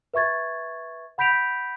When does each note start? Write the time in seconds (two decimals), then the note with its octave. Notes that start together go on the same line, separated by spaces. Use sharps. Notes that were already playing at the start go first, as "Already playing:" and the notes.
0.14 B4 E5 C#6 G#6 A6
1.18 F#5 B5 G6 B6 D7 F7